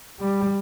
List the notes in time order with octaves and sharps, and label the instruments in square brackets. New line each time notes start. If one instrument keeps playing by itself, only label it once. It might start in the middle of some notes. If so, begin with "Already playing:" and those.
[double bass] G3